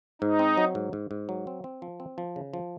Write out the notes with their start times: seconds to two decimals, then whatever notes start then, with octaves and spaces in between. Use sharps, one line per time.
0.22 G#2 D#4
0.39 C4
0.57 F#3
0.75 G#2
0.93 G#2
1.11 G#2
1.29 F#3
1.47 C4
1.64 C4
1.82 F3
2.00 C4
2.18 F3
2.36 C#3
2.54 F3